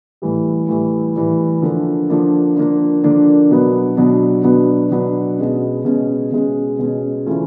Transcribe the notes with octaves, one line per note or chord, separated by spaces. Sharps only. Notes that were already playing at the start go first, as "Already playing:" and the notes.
A2 E3 G3
A2 E3 G3
A2 E3 G3
D3 F3 A#3 D4
D3 F3 A#3 D4
D3 F3 A#3 D4
D3 F3 A#3 D4
B2 F#3 B3 D4
B2 F#3 B3 D4
B2 F#3 B3 D4
B2 F#3 B3 D4
B2 G#3 C#4
B2 G#3 C#4
B2 G#3 C#4
B2 G#3 C#4
C#3 E3 A3 C#4 F4